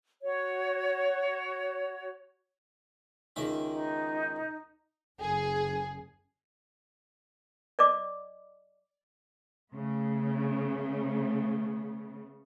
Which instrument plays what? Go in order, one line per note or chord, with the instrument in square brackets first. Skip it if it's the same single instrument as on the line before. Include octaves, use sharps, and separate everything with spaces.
[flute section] F#4 C#5
[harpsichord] C#2 D#3 E5
[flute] D#4
[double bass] F#1 [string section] G#4
[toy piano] D5 D#5 D6
[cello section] C#3 A3 B3